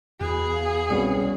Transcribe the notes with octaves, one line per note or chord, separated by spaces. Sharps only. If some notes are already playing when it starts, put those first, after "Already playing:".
E2 F#4 G#4 G#5 B5
F5
C2 B2 B3 C#4 C#5